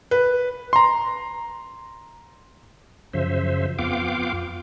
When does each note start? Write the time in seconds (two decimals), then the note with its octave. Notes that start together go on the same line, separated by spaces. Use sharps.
0.11 B4
0.73 A#5 C6
3.13 F#2 C#3 F3 C5 E5
3.79 F2 B3 F4 F5 G5 D6